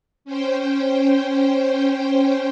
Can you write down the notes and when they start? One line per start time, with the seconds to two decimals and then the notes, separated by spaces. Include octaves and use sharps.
0.25 C#4 C5 G5